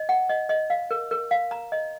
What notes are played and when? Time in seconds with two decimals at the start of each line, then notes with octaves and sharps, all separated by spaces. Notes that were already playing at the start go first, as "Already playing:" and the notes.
Already playing: D#5
0.09 F#5
0.29 D#5
0.49 D#5
0.70 F5
0.91 A#4
1.11 A#4
1.31 F5
1.51 A#5
1.72 D#5